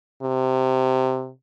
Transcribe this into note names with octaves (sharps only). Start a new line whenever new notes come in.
C3